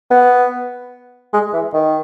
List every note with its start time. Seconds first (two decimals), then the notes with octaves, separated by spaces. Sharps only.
0.11 B3
1.33 G#3
1.53 E3
1.73 D#3